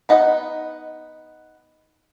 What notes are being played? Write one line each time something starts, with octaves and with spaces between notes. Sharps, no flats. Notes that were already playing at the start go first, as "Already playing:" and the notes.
B3 D#4 F#5